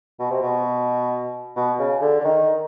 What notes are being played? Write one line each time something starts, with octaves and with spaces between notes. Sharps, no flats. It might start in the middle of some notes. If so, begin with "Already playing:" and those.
B2
C3
B2
B2
C#3
D3
D3
D#3